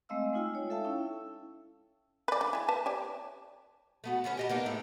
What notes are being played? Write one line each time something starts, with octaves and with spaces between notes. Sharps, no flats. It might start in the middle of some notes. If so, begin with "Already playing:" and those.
G#3 A3 C4 D#5 F5 E6
G#3 D#4 F4 G5 E6
D#4 C#5
A4 E5 F5 G5 A5
C#4 E4 E6
B4 D5
D3
E4 G#4
B4 E5 A5
G4 C#5 D5
A3 B3 F#4
D3 B3 C#4 C#5
G4 D#5 A5
A#3 B3 D4 D#4
A2 G#4 E5